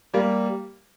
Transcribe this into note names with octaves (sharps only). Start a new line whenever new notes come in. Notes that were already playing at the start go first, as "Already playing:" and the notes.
G3 A#3